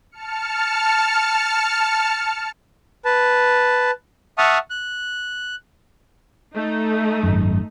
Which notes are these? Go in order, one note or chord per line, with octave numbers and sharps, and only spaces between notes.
A5 F6 C#7
B4 A5
E5 F#5 A5 C#6 D#6 F6
F#6
A3 D#4
G#1 F#2